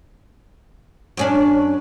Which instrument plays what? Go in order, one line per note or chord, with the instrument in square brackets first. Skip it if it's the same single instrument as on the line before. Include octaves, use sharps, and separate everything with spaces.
[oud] F#2 C#4 D4